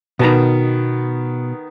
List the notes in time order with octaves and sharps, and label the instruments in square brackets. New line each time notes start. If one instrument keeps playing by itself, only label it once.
[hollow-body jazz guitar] B2 A5 A#5 [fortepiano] D#3 B3